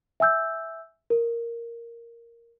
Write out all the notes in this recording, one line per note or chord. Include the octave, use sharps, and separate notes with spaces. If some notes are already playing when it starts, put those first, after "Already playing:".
E5 G#5 E6 G6
A#4